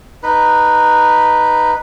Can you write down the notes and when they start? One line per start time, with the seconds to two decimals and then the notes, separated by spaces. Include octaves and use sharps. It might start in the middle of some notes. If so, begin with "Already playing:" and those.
0.23 D#4 B4